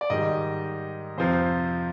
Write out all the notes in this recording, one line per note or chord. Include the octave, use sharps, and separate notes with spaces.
D5
G#2 D#3 G3 D#5
F2 C3 F3 C5